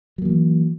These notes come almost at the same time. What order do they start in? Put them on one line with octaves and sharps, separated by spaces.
F#3 A#3 E3